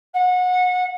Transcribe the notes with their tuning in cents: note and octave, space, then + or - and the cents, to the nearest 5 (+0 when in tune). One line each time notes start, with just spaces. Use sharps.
F#5 -30